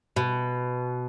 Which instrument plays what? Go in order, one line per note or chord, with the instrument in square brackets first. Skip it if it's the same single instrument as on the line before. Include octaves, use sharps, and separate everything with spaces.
[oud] B2